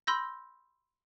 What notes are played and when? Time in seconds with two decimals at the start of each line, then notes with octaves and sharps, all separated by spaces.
0.07 B5 C6 E6 G6 A#6